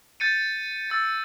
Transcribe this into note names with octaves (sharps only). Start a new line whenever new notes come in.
G6 A6 C#7 D#7
E6 A6